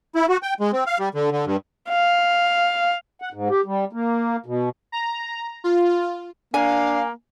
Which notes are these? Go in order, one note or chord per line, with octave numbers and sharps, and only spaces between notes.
E4
F#4
G5
G#3
C4
F5
G3
D3
D3
G2
F5
F#5
G#2
G4
G3
A#3
B2
A#5
F4
A#3 D4 F5 G#5